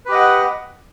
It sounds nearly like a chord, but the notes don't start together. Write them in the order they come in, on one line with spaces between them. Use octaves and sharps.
B4 G4 D#5 F#5